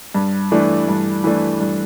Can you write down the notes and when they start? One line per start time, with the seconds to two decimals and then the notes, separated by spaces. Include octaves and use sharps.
0.15 G2
0.52 E3 A3 D4
0.88 G2
1.24 E3 A3 D4
1.60 G2